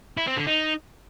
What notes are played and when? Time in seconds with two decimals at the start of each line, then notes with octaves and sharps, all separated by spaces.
0.17 E4
0.27 C4
0.37 D3
0.47 D#4